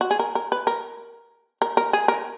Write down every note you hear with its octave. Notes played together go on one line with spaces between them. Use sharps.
F#4
G#4
A#4
A#4
B4
A#4
A#4
A#4
G#4
A#4